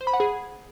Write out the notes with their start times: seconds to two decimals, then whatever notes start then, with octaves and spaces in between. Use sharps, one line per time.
0.01 C5
0.07 B5
0.13 F#5
0.20 G#4